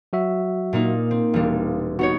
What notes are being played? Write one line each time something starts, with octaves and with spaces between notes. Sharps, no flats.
F#3 F#4 E5
A#2 A#3 D#4
C4
E1 G3 F5
B3 D#4 F#4 C#5